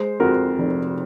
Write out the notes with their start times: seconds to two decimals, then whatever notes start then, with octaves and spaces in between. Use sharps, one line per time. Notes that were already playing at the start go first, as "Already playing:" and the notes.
Already playing: G#3 C5
0.20 F2 F#4 A#4
0.59 F1